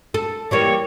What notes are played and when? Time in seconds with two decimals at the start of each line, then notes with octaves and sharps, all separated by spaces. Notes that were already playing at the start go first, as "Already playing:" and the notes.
0.14 A4
0.51 E3 G3 A#3 C#5